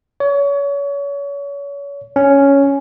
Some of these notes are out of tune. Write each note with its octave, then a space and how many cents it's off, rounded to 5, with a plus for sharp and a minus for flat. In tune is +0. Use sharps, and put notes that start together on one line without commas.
C#5 +30
C#4 +5